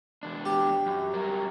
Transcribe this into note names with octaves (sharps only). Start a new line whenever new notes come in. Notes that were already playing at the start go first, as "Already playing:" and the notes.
E2 D4
G4
F#2
F#3 G3 A#4